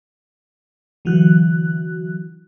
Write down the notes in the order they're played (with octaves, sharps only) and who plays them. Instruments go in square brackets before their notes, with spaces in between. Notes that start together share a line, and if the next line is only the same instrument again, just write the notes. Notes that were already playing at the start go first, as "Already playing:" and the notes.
[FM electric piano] D3 E3 F#3 F#4 F#6